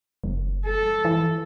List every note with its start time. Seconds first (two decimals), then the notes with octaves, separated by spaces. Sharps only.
0.24 F#1
0.66 A4
1.05 E3